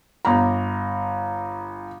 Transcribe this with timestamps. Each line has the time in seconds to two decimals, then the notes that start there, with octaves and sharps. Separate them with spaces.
0.25 G1 A#5